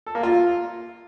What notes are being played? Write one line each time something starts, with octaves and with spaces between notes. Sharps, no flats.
A4
A#3
F4